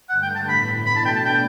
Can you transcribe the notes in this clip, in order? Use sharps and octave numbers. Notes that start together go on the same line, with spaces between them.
G2 D3 A3 F#5
G5
A5
A2 E3 B3 E4 B5
B2 A3 D4 B5
A5
G5
A5
G5